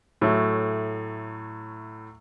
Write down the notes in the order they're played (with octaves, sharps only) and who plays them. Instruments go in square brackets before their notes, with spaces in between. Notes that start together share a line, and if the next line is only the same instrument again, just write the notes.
[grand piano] A2 F#3 A3